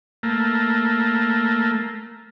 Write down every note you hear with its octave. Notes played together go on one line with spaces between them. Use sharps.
A3 A#3